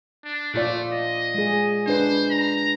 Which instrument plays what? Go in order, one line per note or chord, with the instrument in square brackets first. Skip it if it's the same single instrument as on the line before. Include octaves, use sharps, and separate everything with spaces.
[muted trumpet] D4
[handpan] A#2 F4 D5 [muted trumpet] A3
[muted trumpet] D#5
[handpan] G#3 G#4
[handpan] D4 B4 [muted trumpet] C5
[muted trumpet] A#5